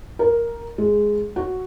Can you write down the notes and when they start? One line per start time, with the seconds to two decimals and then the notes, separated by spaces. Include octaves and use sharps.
0.19 A#4
0.78 G#3
1.36 F#4